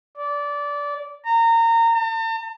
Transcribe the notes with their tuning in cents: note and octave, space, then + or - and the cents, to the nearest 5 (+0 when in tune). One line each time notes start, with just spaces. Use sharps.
D5 -20
A#5 -25
A5 +45